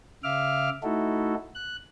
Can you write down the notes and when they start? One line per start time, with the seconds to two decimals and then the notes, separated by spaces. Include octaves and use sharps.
0.24 C#3 E5 F5 D6 F6
0.83 A3 D#4 E4 F#4 A4
1.55 F#6